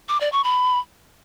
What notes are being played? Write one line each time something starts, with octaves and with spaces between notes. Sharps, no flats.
D6
D5
C#6
B5